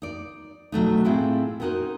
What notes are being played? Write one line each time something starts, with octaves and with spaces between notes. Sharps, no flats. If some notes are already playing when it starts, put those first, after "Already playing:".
D#4 D5
B2 F#3 A3 D#4
A2 C4 E4 F4 G#4
B3 C#4 D#4 F#4 A#4 C5